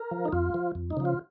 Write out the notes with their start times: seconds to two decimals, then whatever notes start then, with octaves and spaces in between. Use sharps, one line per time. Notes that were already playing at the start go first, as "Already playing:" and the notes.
Already playing: A#4
0.11 F3
0.25 D#4
0.32 F2 F4
0.54 F3
0.75 F2
0.90 D#4
0.97 C#3 F3
1.05 F4